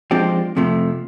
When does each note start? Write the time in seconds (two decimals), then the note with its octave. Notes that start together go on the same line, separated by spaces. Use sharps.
0.11 F3 G#3 C4 D4 G4
0.57 F2 C3 F3 A3